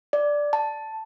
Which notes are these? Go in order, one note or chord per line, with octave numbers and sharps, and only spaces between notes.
D5
A5